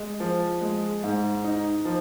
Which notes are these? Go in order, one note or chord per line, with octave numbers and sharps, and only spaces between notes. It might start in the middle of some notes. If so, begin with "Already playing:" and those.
Already playing: G#3
F3
G#3
G#2
D#4
F3